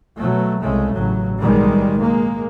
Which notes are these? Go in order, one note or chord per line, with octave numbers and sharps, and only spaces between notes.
B2 F#3 A3
C2 C#3 G#3 A3
A1 C#3 F#3
B1 D#3 G3 G#3
G#3 A#3